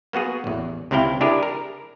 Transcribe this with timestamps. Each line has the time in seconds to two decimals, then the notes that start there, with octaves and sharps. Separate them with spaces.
0.13 A#3 B3 F#4 G#4
0.44 A1 E2
0.91 C#2 C3 C4 E4 F5 G5
1.21 D4 E4 G4 G#4 A#4
1.43 A#4